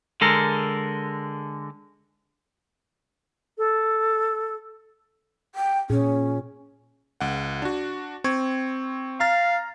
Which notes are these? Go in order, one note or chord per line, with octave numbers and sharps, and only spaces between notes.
D3 G#3 A4 A#4
A4
G5
A#2 C#4 G#4
C#2 F#5
D4 F#4
C4 C#6 G#6
F5 A#5 F6 A6